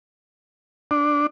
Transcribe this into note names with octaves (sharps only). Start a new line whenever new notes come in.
D4